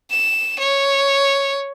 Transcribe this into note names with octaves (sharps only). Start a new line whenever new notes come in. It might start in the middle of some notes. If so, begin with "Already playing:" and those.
E7
C#5